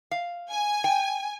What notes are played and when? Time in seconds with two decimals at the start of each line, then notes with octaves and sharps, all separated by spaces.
0.11 F5
0.50 G#5
0.84 G5